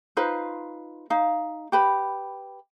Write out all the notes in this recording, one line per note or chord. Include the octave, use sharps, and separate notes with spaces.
D#4 F4 B4 C5
D#4 F5
G4 B4 B5